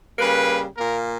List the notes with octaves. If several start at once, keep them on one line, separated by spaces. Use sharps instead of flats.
C#3 G3 A#3 B4
A#2 A#3 A#4